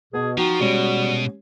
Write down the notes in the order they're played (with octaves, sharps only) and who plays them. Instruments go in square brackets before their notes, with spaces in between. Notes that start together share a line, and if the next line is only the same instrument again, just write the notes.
[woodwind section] B2 [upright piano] B3 A5 [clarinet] G#4
[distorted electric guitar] F3 [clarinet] D#4 [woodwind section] F#4 [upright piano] G5
[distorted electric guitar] B2 [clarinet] G3 [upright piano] G#3 C#4 G4